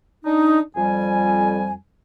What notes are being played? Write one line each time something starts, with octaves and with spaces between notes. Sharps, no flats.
D4 D#4
F2 G3 G#5